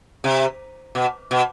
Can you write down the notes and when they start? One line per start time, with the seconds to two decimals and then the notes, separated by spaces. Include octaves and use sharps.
0.24 C3
0.95 B2
1.31 B2